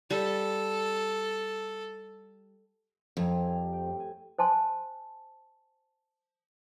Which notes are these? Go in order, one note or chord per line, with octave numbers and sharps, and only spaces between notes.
G3 A4
F2 C4 G#5 A#5
G3
G5
A2
G#5
C5 G#5 A5 C6